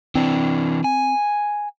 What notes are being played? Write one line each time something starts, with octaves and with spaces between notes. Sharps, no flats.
E3 C4 D4
G#5